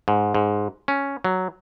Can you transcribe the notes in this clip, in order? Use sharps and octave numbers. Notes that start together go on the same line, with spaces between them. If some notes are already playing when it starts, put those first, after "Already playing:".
G#2
G#2
C#4
F#3